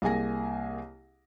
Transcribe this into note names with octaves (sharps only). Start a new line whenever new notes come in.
C2 A#3 G#4 G#5 A#6